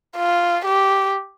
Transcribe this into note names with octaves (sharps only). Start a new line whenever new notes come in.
F4
G4